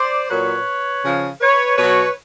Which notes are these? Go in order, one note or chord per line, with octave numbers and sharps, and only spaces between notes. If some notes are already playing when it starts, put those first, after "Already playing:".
Already playing: C5 D5
A#2 F#3 B4 C#5
C#3 F3
B4 C#5
B2 F#3 B4 C#5